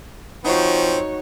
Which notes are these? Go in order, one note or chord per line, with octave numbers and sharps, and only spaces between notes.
F3 C4 D#4 F#4 C#5